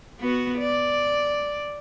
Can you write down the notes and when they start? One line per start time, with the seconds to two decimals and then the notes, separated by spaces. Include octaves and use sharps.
0.20 B3 F#4
0.59 D5